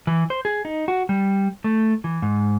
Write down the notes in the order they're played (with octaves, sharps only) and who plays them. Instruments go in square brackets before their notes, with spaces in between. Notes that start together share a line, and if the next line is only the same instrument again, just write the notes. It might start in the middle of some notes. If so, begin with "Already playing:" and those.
[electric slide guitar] E3
C5
G#4
D#4
F#4
G3
A3
E3
G#2